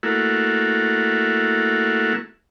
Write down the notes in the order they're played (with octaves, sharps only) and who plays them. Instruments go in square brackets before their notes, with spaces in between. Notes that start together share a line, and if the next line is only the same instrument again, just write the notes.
[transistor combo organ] A3 A#3 E4 F#4